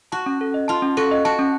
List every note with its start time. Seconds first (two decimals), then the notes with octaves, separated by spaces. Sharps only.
0.12 F#4 A5
0.26 C#4
0.41 A4
0.54 D#5
0.68 F4 A5
0.82 C#4
0.97 F#4 A4
1.11 D#5
1.25 F#4 A5
1.39 C#4